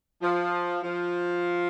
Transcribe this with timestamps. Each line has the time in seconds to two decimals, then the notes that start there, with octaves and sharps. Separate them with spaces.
0.22 F3
0.83 F3